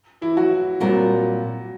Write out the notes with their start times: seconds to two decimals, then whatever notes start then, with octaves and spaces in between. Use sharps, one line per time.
0.21 E3 E4
0.37 F#3 F#4
0.80 A#2 F#3 G3 C4 F4 F#4 A#4